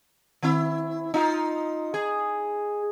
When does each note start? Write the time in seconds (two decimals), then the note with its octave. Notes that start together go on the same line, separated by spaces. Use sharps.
0.42 D#3 C4 E4
1.14 D#4 F4
1.94 G#4